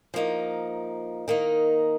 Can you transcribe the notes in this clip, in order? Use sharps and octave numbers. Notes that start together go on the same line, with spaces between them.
F3 A#3 D#4
D#3 A#3 D#4